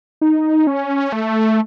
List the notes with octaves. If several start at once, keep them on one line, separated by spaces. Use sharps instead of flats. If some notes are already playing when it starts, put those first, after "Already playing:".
D#4
C#4
A3